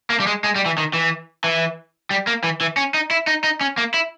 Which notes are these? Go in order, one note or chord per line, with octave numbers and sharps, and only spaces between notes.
A#3
G3
G#3
G#3
G3
E3
D#3
E3
E3
G3
A#3
E3
E3
C#4
D#4
E4
D#4
D#4
C#4
A#3
E4